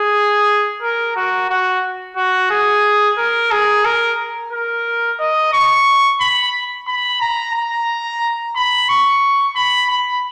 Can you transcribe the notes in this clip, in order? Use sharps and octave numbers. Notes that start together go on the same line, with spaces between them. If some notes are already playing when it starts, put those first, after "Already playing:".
Already playing: G#4
A#4
F#4
F#4
F#4
G#4
A#4
G#4
A#4
A#4
D#5
C#6
B5
B5
A#5
A#5
B5
C#6
B5
B5